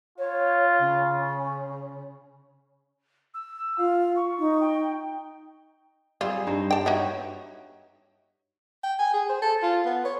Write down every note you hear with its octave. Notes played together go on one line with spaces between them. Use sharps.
F4 C#5
C#3
E6
F4 F5
C#6
D#4
G5
G3 C4 F4 G#4
G2 D#4 C5
G5 A5
D#4 F#4 C#5 E5
G5
G#5
G#4
C5
A4
F4
B3
C#5